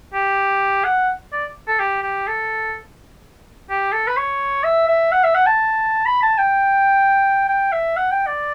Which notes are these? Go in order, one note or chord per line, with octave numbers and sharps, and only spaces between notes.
G4
F#5
D5
A4
G4
G4
A4
G4
A4
B4
C#5
E5
E5
F#5
E5
F#5
A5
B5
A5
G5
G5
E5
F#5
G5
D5